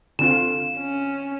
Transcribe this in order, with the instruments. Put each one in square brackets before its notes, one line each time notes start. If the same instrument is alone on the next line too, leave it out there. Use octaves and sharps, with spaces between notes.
[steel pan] D3 C4 F4 [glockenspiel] E7
[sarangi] C#4